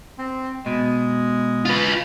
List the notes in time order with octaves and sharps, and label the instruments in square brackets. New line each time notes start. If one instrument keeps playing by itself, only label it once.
[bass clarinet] C4
[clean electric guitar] B2 [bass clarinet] G#3
[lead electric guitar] F4 B4